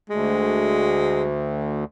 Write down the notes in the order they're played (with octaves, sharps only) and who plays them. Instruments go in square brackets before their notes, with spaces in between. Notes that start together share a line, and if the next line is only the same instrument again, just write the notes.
[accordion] D2 [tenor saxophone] G#3